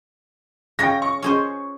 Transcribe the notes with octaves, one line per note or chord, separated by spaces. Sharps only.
C#3 C#4 G5 A#6
C#6
C#4 G#4 C5